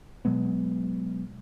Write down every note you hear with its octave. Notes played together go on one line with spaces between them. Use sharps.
B2 F#3 G#3 B3